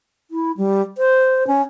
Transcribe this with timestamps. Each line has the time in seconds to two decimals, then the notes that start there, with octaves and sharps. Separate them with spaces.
0.31 E4
0.57 G3
0.98 C5
1.47 C#4